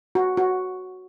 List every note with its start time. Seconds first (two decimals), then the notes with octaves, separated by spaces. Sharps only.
0.15 F#4
0.37 F#4